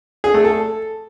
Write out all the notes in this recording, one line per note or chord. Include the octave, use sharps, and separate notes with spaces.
G#4
A3
A4